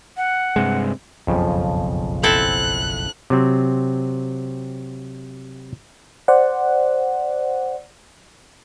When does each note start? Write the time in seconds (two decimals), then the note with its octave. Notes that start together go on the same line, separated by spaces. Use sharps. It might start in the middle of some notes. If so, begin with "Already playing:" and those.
0.17 F#5
0.56 G2 C3 G#3
1.27 F#1 B1 F2 C#3 F3
2.23 C4 E4 A4 F#6
3.30 C3 F#3 C4
6.28 C5 D5 F#5